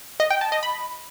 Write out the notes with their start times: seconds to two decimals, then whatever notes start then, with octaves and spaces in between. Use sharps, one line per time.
0.20 D#5
0.30 G5
0.41 A5
0.52 D#5
0.63 B5